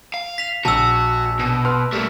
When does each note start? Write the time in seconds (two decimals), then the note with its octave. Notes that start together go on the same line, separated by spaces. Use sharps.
0.14 F5
0.38 B6 F7
0.65 A#1 F#4 A5 E6
1.39 B2
1.65 B4 C6 F6
1.93 G3 A3 A#3